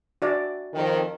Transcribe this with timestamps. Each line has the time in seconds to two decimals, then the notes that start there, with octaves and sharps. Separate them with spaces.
0.22 F#4 D5 E5
0.74 F2 D#3